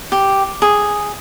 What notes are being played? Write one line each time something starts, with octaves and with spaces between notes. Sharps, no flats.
G4
G#4